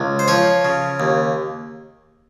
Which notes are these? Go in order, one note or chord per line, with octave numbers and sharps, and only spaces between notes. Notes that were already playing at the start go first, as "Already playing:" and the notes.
Already playing: C#2
C5
F3 C#5
C#3
D#2